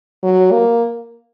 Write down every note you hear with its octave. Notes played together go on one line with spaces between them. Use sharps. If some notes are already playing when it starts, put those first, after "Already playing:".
F#3
A#3